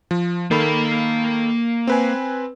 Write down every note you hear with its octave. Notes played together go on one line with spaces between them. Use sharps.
F3
D#3 A#3 A4 F5 B5
C4 B4 G#5